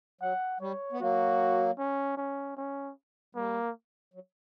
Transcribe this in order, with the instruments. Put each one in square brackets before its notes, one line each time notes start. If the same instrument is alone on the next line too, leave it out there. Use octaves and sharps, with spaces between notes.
[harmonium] F#3 [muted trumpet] F#5
[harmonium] G3 [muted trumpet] C#5
[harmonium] B3
[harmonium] F#3 A#3 [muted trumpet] F#4
[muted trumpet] C#4
C#4
C#4
[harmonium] G3 [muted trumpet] A#3
[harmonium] F#3